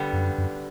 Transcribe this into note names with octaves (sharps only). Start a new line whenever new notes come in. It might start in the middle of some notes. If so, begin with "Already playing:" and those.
Already playing: D3 G3 B3
F#2
F#2